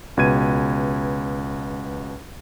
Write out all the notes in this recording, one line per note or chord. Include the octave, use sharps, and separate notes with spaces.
C#2 B2 B4 G#6 D#7